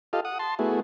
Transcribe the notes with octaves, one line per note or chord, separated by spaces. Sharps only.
F4 G4 A4 D#5 F5
F#5 D#6
A5 C6
A3 B3 E4 F#4 G#4